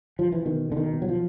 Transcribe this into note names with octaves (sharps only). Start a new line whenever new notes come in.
F3
E3
B2 D#3
B2 D3
D#3
B2
F#3
F3